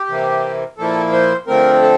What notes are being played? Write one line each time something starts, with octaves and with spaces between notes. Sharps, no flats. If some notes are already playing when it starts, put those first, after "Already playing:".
Already playing: G4
C3 E3 A#3
A#2 F3 A#3 E4 A4
C5
D3 F3 A3 C4 A#4
A4